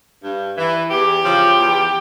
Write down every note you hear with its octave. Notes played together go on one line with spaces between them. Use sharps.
G2
E3
E2 G4
C#3 F3
E2